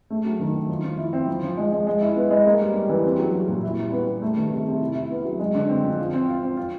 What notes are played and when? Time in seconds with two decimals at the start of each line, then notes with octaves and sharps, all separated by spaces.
0.10 A3
0.25 F#3
0.40 D#3
0.54 D#3
0.69 F3
0.84 F3
0.98 E4
1.13 C4
1.28 F3
1.43 F3
1.57 G#3
1.72 G#3
1.87 G#3
2.01 E4
2.16 B3
2.30 G#3
2.46 A#3
2.60 G3
2.74 G3
2.89 E3
3.04 C4
3.19 F#3
3.33 F#3
3.48 A#2
3.63 E4
3.78 G3
3.92 B3
4.07 G3
4.22 A3
4.36 D#3
4.51 C3
4.67 C3
4.81 E4
4.95 E4
5.10 B3
5.25 F#3
5.40 G#3
5.54 D3
5.69 C4
5.84 F3
5.99 F4
6.14 C4
6.28 F4
6.43 C4
6.57 F4